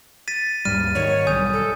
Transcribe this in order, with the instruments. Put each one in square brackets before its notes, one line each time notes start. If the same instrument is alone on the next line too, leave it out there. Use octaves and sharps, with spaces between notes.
[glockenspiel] A6 B6 D#7
[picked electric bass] D#2 G#2 G3 [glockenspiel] F6 D#7
[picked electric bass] G#2 D#3 [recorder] C#5
[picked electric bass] B1 G3 [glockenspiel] G#5 D#6 G6
[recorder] A4